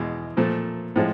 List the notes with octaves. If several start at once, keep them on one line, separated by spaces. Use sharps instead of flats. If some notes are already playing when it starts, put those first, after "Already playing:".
Already playing: E2 B2 G#3
A#2 F3 A3
A2 F3 G#3